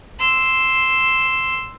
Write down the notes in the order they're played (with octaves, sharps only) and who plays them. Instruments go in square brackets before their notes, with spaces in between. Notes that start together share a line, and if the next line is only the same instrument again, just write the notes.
[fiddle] C6 E6